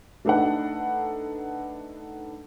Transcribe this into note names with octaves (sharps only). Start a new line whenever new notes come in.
A3 D4 D#4 A4 B4 F#5